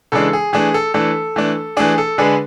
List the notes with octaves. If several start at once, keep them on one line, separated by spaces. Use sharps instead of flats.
C#3 E3 G#3 D4 A4
G#4
E3 A3 D4 G#4
A4
E3 A3 D4 A4
E3 A3 D4
E3 A3 D4 G#4
A4
D3 G#3 D4 G#4 B4